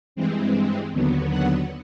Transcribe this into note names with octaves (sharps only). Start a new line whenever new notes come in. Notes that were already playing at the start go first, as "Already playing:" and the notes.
G2 E3 G#3 C4
D#2 D3 F#3 B3
F#5